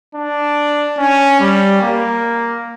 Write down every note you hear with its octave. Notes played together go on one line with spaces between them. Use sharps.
D4
C#4
G3
A#3